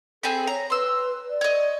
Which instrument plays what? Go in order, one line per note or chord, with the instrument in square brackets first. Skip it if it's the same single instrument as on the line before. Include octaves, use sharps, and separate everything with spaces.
[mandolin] C4 G#4 B5 [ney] A4
[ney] C#5 [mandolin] A#5
[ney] B4 [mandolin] C6 E6
[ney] D5
[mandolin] C#5 D#5